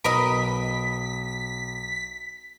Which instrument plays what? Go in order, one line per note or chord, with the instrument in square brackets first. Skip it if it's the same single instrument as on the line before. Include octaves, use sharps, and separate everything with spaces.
[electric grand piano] B1 D#6 [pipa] A#4 B4 D#5 [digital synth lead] B6